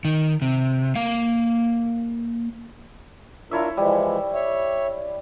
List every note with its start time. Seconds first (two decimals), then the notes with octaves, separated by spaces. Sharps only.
0.05 D#3
0.42 C3
0.96 A#3 F5
3.51 D4 E4 F4 A#4 C#5 E5
3.77 E3 F3 G3 G#3
4.34 C#5 E5